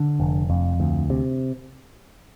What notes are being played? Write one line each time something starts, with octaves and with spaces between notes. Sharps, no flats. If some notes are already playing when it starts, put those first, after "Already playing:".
Already playing: D3
F1
F2
D2
C3